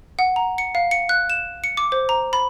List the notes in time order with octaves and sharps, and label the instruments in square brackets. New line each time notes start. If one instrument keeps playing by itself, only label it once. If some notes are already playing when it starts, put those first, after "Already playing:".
[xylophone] F#5
A#5
C#7
F5
C#7
F#6
E7
C#7
D6
C5
A#5
B5